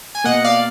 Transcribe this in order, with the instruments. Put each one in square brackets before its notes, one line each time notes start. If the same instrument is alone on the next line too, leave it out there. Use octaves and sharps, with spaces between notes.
[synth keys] G#5
B2 A#3 D#5 F#5
D5 F5